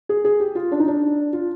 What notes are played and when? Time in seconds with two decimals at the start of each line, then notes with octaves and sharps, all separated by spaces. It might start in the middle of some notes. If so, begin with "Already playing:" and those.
0.09 G#4
0.25 G#4
0.40 G4
0.55 F4
0.72 D4
0.80 D#4
0.88 D4
1.33 F4